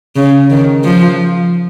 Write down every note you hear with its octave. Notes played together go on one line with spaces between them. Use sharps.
C#3
D#3
F3